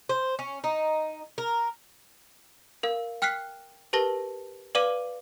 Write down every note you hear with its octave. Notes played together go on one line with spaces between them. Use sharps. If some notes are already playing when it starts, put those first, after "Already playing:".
C5
C#4
D#4
A#4
A#4 F5
G5 F6 F#6 B6 C7
G4 A#4 B4 A5 A#6 G7
B4 D5 F5 D6 D#7